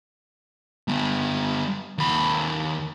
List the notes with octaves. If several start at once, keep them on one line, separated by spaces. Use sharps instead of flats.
G3 B3
D#2 B5